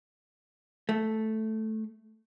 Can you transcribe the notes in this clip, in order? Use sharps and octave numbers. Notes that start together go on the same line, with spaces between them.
A3